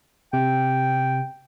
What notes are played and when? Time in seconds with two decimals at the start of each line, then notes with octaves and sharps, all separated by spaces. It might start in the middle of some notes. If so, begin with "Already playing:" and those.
0.33 C3 G5